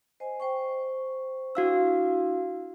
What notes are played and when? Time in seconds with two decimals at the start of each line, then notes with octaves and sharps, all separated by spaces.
0.20 C5 D#5 G#5
0.40 C5 G5 C#6
1.55 D4 E4 F#4 F5 E6